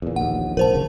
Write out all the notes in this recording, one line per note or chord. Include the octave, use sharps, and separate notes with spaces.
E2 A#2
A#1 D#2 F#5
F1 A#1 F3 A#4 C5 A5
F#1 C#3